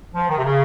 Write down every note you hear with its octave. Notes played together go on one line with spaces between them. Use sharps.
F3
D#3
C3
C#3